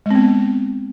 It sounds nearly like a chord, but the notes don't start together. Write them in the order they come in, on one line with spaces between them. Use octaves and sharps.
G#3 C4 B3